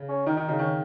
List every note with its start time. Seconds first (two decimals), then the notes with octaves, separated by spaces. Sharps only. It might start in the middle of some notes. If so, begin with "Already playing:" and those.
Already playing: C#3
0.09 C#4
0.26 D#3 D#4
0.36 D#3 D#4
0.48 C#3 D#4
0.59 D#3 C#4